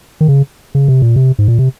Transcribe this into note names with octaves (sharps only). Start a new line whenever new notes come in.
D#3
C#3
C#3
C3
A#2
C3
G#2
A#2
C3